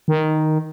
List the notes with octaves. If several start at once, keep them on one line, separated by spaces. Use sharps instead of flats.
D#3